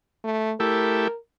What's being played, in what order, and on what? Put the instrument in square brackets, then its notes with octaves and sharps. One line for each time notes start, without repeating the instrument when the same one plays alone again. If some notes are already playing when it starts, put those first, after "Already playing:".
[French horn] A3
[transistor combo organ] A3 E4 G4 [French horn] A#4